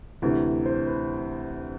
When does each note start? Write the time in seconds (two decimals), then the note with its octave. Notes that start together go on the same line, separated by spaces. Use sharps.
0.22 D2 C3 E3
0.66 C5
0.87 B4